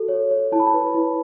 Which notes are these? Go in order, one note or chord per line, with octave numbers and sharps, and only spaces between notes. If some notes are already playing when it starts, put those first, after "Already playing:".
Already playing: F#4 A4
C#5
C#5
E4 A5
B5
A5
B4
E4